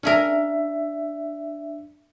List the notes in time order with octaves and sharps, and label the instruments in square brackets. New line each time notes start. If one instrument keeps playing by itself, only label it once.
[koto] C#4 G#4 A#4 [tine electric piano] D4 E5